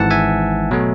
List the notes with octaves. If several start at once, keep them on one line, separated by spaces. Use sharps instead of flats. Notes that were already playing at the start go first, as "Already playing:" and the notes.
Already playing: G#1 G#2 E3 F#5 A5
E5 G#5
B2 F#3 A3